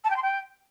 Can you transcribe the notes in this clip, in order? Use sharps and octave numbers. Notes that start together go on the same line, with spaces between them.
A5
G5
C6
G5